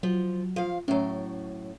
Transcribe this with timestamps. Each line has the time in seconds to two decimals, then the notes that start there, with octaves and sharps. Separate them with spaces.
0.03 F3 F#3
0.56 F3 F5
0.88 A2 F#3 C#4